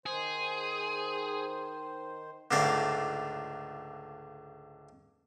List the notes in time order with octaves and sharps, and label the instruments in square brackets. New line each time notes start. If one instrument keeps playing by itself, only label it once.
[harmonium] D#3 C5 [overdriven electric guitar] G#4
[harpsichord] C#2 G#2 D3 A3 F4 D5